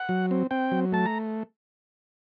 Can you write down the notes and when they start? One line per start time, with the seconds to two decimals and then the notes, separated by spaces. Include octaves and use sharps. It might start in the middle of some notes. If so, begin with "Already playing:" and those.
Already playing: F#5
0.09 F#3
0.31 C4
0.51 C4 G5
0.72 F#3
0.92 A3 A5
1.06 A#5